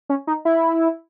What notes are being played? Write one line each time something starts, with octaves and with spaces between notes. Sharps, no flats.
C#4
D#4
E4